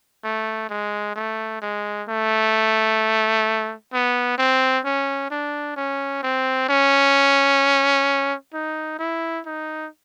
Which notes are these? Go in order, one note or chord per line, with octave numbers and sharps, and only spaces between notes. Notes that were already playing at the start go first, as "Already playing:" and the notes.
A3
G#3
A3
G#3
A3
B3
C4
C#4
D4
C#4
C4
C#4
D#4
E4
D#4